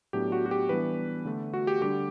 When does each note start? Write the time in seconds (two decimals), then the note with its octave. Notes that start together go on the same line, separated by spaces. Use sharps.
0.13 A2 F#3 B3 D4 G4
0.32 F#4
0.46 F#4
0.51 G4
0.69 E3 G3 B3 D4 B4
1.25 D3 A3 D4
1.54 F#4
1.67 G4
1.82 D3 G3 D4 G4